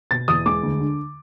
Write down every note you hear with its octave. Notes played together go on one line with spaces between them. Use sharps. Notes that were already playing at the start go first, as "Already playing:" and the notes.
B2 A6
E2 D#6
G#3 D6
D2
D3